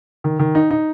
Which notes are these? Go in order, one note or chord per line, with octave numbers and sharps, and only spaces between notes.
D#3
D#3
D#4
D#4